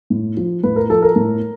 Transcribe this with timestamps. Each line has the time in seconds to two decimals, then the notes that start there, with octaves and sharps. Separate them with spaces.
0.10 A2
0.37 F3
0.63 A2 B4
0.76 A#4
0.90 F3 A4
1.02 A#4
1.16 A2